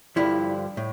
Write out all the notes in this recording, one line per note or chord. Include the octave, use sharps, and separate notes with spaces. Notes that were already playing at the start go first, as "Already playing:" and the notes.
G2 D3 F3 E4
A2